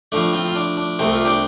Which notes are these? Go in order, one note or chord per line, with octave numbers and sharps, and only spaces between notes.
A2 F3 A3 D4
C4 F4
F4
D4
D4
C2 C3 A3 G4
F4
D4 G4